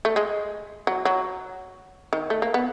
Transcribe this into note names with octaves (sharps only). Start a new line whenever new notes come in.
A3
G#3
F#3
F#3
D#3
A3
A#3
B3